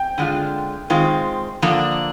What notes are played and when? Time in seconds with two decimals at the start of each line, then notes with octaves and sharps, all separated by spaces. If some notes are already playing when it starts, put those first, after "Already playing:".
Already playing: G5
0.18 D3 G#3 D4 F4
0.90 D#3 G#3 C4 F4
1.62 D3 F3 A#3 D4